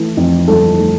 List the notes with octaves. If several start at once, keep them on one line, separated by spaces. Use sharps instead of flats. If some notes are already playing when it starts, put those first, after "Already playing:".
Already playing: E3 A3
F2
G1 A4
A3